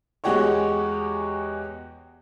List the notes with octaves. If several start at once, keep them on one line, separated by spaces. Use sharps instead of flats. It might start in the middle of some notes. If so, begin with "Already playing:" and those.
E2 G#3 F#4 G4 C#5 C#6